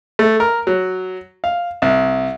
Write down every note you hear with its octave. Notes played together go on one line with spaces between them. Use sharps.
A3
A#4
F#3
F5
C2